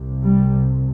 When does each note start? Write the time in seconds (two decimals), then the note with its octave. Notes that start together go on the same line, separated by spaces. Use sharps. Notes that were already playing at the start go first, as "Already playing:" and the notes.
Already playing: C2 C3
0.23 G3